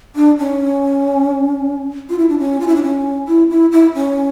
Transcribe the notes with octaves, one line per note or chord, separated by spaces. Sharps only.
D4
C#4
F4
E4
D4
C#4
F4
E4
D4
C#4
E4
E4
E4
C#4